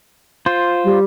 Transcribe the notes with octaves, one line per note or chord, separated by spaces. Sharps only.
F4 C5
G3